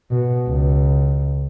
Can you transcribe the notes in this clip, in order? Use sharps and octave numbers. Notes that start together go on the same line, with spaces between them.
B2
C#2